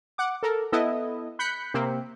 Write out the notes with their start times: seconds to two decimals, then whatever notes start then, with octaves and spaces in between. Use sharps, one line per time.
0.18 F#5 D6
0.43 A4 A#4
0.72 B3 E4 A4 D#5
1.39 B5 F#6 G6 B6 C#7
1.74 C3 A#3 C4